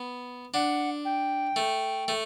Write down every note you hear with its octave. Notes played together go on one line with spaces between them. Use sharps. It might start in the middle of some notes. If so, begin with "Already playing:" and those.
Already playing: B3
D4 F#5
G5
A3
A3